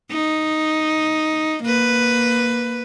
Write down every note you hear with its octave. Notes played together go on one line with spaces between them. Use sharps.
D#4
A#3 B4